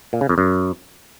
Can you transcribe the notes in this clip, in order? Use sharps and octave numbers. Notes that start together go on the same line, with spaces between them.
A#2
C#3
F2
F#2